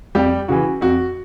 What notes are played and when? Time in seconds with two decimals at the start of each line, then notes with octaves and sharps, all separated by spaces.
0.15 F2 G3 G4
0.48 C#3 E3 F#4
0.81 F2 F#4